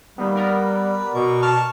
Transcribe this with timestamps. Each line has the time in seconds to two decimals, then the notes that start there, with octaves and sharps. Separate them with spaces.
0.18 D#3 G3 A#3 B3 B4
0.35 B3 A#4 D5
1.15 B2 C#6 D6
1.42 A5 C#6 F6